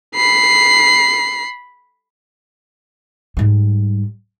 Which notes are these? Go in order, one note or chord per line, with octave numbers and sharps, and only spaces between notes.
B5 C7
G#2 G3